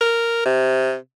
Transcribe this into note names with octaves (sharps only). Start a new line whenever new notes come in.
A#4
C3